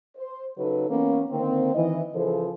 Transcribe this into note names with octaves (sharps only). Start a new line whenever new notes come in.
C5
C#3 F#3 D#4 A4 B4
E3 A#3 B3 C#4
D3 D#3 A#3 C4
D#3 E3 D#5
C#3 E3 F3 G#4 A4 C5